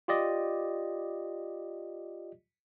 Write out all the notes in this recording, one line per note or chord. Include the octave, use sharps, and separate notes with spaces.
F4 G4 D5 D#5